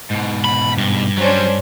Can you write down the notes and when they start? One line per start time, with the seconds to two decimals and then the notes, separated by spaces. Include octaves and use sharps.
0.11 G#2 B2
0.44 B5
0.78 G2
1.18 F#3 G3 C#4 D4 C5